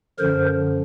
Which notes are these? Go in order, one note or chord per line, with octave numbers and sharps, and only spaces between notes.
F#2 D3 F3 A#4 C5